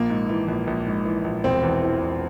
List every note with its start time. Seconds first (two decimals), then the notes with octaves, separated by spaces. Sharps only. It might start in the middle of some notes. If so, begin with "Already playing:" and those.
Already playing: A#1 A#3
0.10 G#2
0.29 E3
0.48 A#1
0.67 A#1
0.86 G#2
1.05 E3
1.24 A#1
1.44 E1 C4
1.63 E2
1.82 E3
2.01 E1